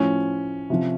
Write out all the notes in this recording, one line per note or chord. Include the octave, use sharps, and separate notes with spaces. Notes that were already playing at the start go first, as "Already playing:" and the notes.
Already playing: A2 F3 C#4
C3 F3